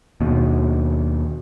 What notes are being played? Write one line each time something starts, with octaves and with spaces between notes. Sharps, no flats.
D#2 B2